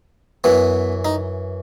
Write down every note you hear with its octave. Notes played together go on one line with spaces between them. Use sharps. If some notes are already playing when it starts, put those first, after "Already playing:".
F#2 E3 B3
D#4